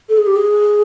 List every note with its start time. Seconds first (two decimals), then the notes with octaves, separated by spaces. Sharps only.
0.09 A4
0.18 G#4
0.27 G4
0.36 G#4